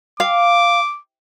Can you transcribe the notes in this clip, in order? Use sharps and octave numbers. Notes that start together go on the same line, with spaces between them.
F5 D6